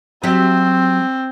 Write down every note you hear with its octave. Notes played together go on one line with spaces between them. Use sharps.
F#3 C4 G4 E5